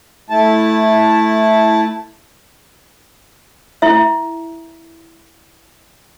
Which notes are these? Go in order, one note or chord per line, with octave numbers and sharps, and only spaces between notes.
A3 E4 A5
E4 E5